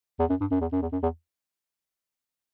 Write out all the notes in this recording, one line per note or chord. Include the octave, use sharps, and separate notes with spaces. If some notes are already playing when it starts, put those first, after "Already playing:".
E2
F#2
G2
F#2
E2
F#2
E2
F#2
E2